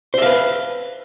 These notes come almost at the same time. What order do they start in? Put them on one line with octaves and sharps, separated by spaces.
C5 E5 F5 B4